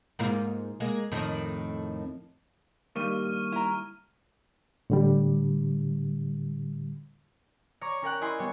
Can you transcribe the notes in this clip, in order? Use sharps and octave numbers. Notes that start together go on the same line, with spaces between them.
G#2 A#3 F4
G#3 A#3
F2 A2 D#3
G2 D#3 G3 A#3 C#6 F6 D#7
E4 A#5
A2 D3 G3
C#5 A#5 C#6 D6
C#4 A#4 G5 F#6
E4 D#5 G#5 B5 C6
G3 B3 C#5